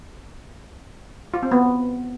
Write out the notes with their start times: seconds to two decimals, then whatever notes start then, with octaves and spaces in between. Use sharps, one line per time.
1.34 F4
1.43 C4
1.52 B3